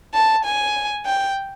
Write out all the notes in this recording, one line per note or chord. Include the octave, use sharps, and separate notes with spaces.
A5
G#5
G5